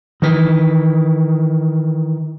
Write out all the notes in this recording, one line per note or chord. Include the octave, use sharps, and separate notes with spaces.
D#3 E3